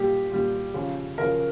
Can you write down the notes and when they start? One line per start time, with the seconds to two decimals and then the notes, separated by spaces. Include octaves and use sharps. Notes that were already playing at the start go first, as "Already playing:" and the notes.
Already playing: A#2 G3 G4
0.31 A#2 G3
0.74 C#3 F3
1.18 C#3 F3 A#4